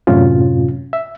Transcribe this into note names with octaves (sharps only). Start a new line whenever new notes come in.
F#2 A2 C3 C#4 F4
E5